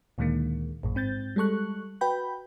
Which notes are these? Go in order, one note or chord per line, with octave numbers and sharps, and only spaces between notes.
D2 A#2 D3 D#3 G#3 A#3
A1 F#2 A#2
G#2 C4 G6 A6
G3 G#3 A4 C#6 F#6
F#4 B4 G5 B5 G6